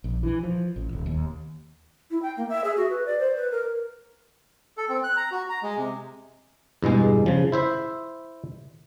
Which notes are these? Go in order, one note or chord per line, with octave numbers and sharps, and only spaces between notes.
A#1
E3
F3
A1
D#1
D#2
E4
G5
A#3
E5
G#4
F#4
B4
D5
C5
B4
A#4
A4
C4
F#6
A#5
F#4
A#5
G#3
C3
E2 G2 B2 G#3
C#3 F3
E4 C5 E5